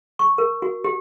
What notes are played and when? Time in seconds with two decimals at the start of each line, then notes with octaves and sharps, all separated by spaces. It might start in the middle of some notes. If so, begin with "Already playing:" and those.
0.19 C#6
0.38 A#4
0.62 F#4
0.84 G4